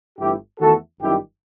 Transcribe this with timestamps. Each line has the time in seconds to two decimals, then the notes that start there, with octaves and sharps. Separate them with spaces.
0.19 G1 G2 E3 A3 E4 G4
0.59 E2 D#3 A3 F#4 A4
1.00 G1 F#2 D#3 G3 E4 G4